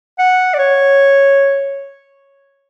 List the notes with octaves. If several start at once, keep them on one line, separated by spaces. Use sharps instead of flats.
F#5
D5
C#5